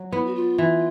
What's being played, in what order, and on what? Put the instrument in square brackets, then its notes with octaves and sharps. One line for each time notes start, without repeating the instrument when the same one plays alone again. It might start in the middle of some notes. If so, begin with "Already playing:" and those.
Already playing: [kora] F#3
[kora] B3 [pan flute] E4
[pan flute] F#4
F4
[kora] E3